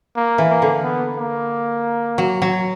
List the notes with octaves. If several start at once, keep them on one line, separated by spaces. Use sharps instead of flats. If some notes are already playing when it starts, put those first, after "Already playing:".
A#3
E3
A#3
D3
B3
A#3
F#3
F#3